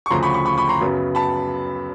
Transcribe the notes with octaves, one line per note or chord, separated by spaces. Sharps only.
C#6
D2 C#3 F3 A#5 C6
B5 C#6
B5 C#6
B5 C#6
B5 C#6
A#5 C6
F#2 C#3 F#3 B3
A5 B5